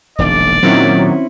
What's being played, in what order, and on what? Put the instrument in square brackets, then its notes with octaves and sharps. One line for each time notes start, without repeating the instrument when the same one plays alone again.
[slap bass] E1 A#1 D#3 [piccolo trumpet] D5
[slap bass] A#2 [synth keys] D#3 F#3 [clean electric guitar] C4 C#4 E4